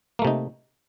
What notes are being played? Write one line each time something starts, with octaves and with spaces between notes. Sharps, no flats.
C3 A3 A#3 D#4